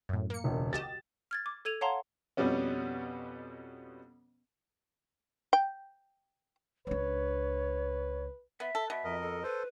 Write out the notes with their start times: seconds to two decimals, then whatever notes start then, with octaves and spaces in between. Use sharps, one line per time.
0.09 F#2 A2
0.30 A#3 C#7
0.44 E1 C#2
0.73 F#4 G4 D#5 A6 E7
1.31 F6 G#6 A6
1.46 D6
1.65 A4 G#6 D#7 F7
1.81 C#5 F5 F#5 A5 A#5 C6
2.37 F2 B2 G3 B3 C#4
5.53 G5
6.87 C#2 D4 B4 C#5
8.60 B3 E5
8.75 A4
8.90 B2 E5
9.04 F2 A#4 D#5
9.22 A4
9.43 A4 B4 C5